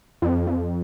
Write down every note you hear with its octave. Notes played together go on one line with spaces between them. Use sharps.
F2
F2